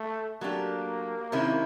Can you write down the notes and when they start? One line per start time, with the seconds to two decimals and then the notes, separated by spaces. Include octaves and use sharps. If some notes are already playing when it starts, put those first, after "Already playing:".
Already playing: A3
0.41 F#3 A3 A#3 D4 G4
1.32 C3 D#3 G#3 C#4 E4